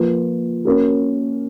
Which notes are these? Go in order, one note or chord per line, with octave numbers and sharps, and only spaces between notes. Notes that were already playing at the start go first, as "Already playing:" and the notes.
Already playing: F3 A#3 F4 B4
A#3 C#4 F#4 A#4